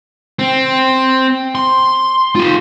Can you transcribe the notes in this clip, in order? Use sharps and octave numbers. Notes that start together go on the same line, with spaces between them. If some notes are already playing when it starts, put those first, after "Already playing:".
C4
C6
F4 G4